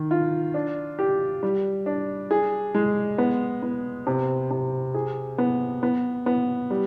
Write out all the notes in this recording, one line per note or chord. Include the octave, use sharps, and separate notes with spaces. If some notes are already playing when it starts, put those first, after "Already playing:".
Already playing: D#3
F4
D4
G4
G3
D4
G#4
G#3
B3
B3
C3
C3
G#4
B3
B3
B3
G3